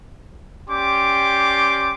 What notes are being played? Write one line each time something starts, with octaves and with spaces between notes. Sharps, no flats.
C#4 G4 D5 G5 C6 D6